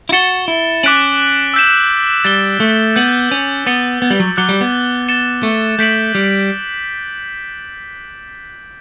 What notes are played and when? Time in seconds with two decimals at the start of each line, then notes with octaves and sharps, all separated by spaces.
0.09 E4
0.12 F#4 A6 C#7 E7 G7
0.48 E4
0.83 C#4 D6 F#6 B6 D7 F#7
1.54 E6 G6 B6 E7
2.24 G3 A6 E7 G7
2.60 A3
2.95 B3 G6 C#7 F#7
3.31 C#4
3.67 B3 A6 C#7 G7
4.02 B3
4.10 G3
4.20 F#3
4.37 F#3 D6 F#6 C#7 G7
4.49 G3
4.61 B3
5.08 A6 C#7 E7 G7
5.43 A3
5.79 A3 G6 B6 D7 F#7
6.15 G3